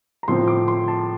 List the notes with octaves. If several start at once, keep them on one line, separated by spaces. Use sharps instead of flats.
A#5
A2 F3 C4 C6
D6
C6
A5